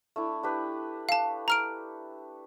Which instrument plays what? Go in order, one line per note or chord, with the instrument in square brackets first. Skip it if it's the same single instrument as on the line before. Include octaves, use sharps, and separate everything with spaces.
[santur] A3 D4 E4
D4 G4 B4
[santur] A4 [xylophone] F5 A5
[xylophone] A#5 F6 D7